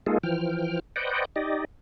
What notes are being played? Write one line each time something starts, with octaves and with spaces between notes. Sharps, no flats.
G#3 A#3 D#4 F4 G#4 A4
E3 F3 G5 F6
B4 C5 D5 D#5 F#5 G5
D#4 G4 D5 D#5